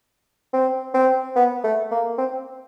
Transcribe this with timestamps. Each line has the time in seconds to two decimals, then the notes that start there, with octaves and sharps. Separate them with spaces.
0.53 C4
0.94 C4
1.36 B3
1.64 A3
1.91 A#3
2.18 C4